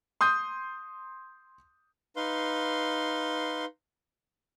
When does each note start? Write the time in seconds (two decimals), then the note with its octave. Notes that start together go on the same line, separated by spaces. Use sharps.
0.21 C6 D#6 G6
2.16 D#4 B4 F5 C6